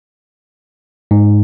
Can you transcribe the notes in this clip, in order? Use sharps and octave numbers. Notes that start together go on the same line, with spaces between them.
G#2